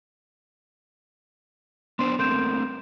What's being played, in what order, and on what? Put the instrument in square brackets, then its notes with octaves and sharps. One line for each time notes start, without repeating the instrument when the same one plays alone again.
[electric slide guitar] B3 D4 C5 [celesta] C6
[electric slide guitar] A3 A#3 C4 [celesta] C6 G6 E7